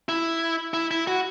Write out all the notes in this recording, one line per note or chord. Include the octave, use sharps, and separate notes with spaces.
E4
E4
E4
F#4